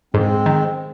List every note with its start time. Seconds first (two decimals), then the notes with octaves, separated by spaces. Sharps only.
0.14 G#2 G#3 C4
0.46 D#3